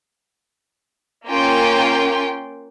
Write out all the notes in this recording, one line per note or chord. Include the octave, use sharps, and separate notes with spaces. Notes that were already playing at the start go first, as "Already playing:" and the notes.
A#3 C#4 F4 G5 C6